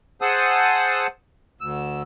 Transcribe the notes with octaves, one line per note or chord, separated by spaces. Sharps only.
G#4 C5 F#5 A5 D#6 E6
D2 E6